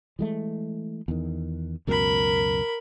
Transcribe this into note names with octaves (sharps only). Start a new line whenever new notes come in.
E3 G#3 A3
E2 D#3
C#2 F#2 B2 A#4 B5